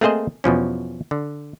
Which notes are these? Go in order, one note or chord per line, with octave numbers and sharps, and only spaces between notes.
A3 A#3 C4 G#4 C5 D#5
E2 B2 F3 C#4
D3